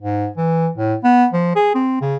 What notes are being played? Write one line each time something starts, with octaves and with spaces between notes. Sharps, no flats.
G#2
E3
A2
B3
F3
G#4
C4
C#3